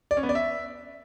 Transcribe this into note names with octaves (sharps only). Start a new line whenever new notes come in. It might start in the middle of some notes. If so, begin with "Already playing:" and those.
D5
C#4
B3
D5
E5